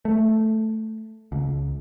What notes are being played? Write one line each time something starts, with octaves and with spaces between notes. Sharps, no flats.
A3
C#2